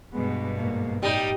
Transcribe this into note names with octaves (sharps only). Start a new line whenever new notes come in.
G2 B2 G#3 B3
G#2 A#3
F#2 A2 G3 D#4